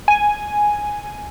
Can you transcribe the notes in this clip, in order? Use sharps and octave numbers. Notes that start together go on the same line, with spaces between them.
G#5